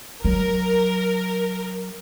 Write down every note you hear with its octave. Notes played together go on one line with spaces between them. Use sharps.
F#3 A#4